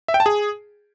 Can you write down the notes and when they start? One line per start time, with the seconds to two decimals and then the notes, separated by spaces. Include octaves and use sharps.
0.08 E5
0.14 G5
0.20 A5
0.26 G#4